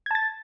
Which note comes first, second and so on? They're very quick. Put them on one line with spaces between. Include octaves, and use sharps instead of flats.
G#6 A5 A6